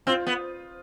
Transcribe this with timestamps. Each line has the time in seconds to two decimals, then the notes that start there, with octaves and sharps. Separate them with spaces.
0.07 C4 F4
0.27 B3